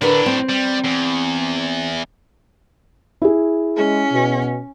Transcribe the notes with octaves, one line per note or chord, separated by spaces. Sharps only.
A2 D3 D4 A#4 B4
C4
G3
E2
E4 G#4
G#3 C#4
B2